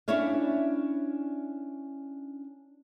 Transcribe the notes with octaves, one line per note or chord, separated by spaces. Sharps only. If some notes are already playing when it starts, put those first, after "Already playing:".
C#4 D4 E4 C#5 E5 F5